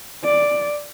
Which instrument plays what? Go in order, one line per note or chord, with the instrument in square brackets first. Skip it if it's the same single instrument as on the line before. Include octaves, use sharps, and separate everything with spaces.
[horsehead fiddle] D5